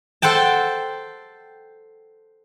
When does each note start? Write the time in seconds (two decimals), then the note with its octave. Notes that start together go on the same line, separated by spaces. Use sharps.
0.22 A4 C5 F#5 G5 A5